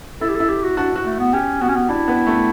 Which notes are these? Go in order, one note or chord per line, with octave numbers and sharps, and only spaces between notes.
E4 A4
G4
A4
E4
G4
F#4
D4 F#4
F#4
A3
B3
C#4 G4
B3 F#4
C#4
B3
D4 E4
B3
A3